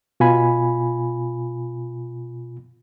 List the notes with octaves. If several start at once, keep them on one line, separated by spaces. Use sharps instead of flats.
B2 F4 G#5 B5